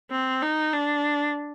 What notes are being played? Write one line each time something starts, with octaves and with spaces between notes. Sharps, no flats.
C4
D#4
D4